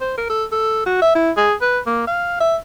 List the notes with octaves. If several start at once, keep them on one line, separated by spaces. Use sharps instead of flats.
C5
A#4
A4
A4
F#4
E5
E4
G#4
B4
A#3
F5
E5